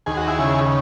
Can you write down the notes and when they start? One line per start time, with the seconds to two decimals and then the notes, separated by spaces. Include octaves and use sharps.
0.06 D#2 G#4
0.17 F#4
0.28 E4 G#4
0.39 C#3